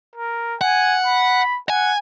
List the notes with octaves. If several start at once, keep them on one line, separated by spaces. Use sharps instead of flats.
A#4
F#5 G#5
B5
F#5 G#5